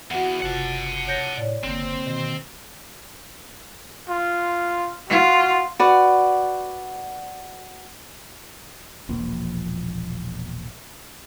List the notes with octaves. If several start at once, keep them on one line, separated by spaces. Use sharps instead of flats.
E2 F#4 F#5
F#1 C3 F4 F#5 A5
C#5 G6 A#6
A2 C#5 D5
F#1 D3 A#3 C4
B2 D#3
F4
F4 F#4
F#4 B4 D5 F#5
E1 A#1 A#2 F3